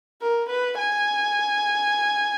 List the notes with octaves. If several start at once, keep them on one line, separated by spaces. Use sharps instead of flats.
A#4
B4
G#5